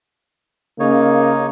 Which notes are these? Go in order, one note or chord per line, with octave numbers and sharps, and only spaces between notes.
C#3 A#3 D#4 C#5